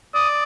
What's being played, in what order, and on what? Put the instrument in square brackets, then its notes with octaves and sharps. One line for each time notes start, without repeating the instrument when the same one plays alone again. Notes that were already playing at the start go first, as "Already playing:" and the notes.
[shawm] D5 [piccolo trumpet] D#6